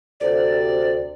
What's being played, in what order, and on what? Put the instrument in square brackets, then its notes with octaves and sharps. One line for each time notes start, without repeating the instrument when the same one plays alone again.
[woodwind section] D2 C3 [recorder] D5